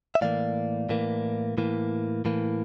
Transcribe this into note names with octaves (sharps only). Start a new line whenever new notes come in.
E5
A2 E3 A#3 D5 F5
A2 E3 A#3
A2 E3 A#3
A2 E3 A#3